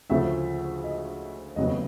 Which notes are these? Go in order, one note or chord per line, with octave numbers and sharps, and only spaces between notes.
D2 C#3 F3 A3 E5
D#5
F1 D#2 C#3 F#3 B3 D#5